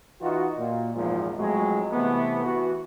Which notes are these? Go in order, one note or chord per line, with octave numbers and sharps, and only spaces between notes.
E3 D#4 F4 F#4
A#2
G#1 E2 A#2 F3 G#3
F2 A2 F#3 G#3
C3 E3 A3 B3
E3 F#4